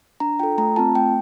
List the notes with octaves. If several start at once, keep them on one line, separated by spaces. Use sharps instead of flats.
D4 A#5
F4 A4 G5
A3 A#5
C4 F4 A5
A3 G5